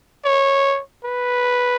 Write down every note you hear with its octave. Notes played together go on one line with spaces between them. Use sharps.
C#5
B4